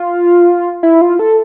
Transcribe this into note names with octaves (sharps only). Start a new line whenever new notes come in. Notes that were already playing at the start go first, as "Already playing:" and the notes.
Already playing: F4
E4
F4
A4